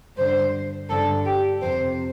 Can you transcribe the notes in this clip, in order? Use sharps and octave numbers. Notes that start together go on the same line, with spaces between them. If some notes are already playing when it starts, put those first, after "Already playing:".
G2 D3 C5
G2 D3 A4
G4
F2 C3 C5